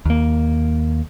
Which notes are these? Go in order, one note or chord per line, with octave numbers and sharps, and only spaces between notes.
D#2 A#3